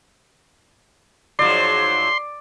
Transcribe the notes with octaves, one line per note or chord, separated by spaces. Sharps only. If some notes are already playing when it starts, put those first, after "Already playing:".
G#2 F3 F#3 D5 C6